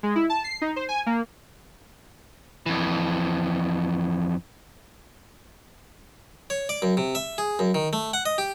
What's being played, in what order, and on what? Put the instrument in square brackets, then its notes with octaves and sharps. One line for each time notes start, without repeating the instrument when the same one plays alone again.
[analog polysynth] G#3
E4
A5
C7
D#4
C5
G#5
A#3
[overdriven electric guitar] F2 E3
[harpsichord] C#5
D5
F#2
C3
E5
G#4
F#2
D#3
A3
F#5
D#5
G4